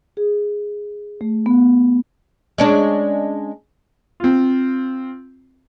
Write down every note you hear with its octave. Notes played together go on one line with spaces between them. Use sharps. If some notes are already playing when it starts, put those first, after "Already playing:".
G#4
A3
B3
G#3 C#4 D4
C4 F4